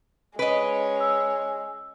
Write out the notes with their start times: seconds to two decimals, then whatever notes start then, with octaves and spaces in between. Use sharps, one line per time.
0.39 G#3 C#4 B4 C#5 D#5 D7
1.00 E6